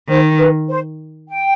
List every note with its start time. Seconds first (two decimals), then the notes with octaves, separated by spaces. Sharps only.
0.09 D#3 C5
0.39 B4
0.69 C5
1.30 G5